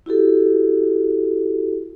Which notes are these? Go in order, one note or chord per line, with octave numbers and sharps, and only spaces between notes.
E4 F#4 G4 A4